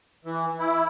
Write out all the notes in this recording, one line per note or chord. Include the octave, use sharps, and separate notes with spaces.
E3
E4